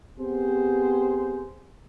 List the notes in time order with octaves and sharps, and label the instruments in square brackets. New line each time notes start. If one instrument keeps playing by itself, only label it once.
[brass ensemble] B3 C4 G4 G#4 C5